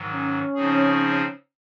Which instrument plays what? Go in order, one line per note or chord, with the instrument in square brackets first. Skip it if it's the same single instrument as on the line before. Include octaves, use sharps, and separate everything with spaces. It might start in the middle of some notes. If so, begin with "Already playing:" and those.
Already playing: [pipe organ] G#2 D#3 F#3
[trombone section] C#4
[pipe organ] C#3 F3 C4 D#4 G#4